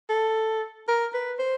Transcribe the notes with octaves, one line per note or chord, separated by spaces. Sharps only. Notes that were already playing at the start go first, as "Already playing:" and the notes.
A4
A#4
B4
C5